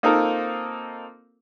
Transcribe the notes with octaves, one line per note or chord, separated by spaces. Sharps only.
A#3 C4 D#4 F4 A4 A#4